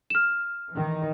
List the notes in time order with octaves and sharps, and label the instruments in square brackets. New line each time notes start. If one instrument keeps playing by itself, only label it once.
[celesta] F6 E7
[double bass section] D#3 E3